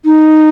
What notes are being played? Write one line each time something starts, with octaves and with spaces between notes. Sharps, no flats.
D#4